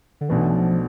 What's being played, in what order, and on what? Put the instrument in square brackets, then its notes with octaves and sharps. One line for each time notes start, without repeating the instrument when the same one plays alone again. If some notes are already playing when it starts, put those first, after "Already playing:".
[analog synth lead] D3
[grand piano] B1 B2 A3 D4 [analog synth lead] E3
[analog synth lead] F3